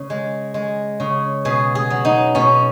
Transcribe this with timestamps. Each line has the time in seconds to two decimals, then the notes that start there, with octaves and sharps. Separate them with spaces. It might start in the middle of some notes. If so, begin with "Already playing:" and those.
Already playing: C#3
0.10 G#3
0.54 G#3
1.00 C#3
1.45 B2 G#4
1.75 G#4
1.90 F#3
2.05 D#4
2.35 B2 C#4